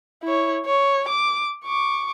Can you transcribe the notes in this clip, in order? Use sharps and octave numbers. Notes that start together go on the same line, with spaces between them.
E4 C#5
C#5
D6
C#6 D6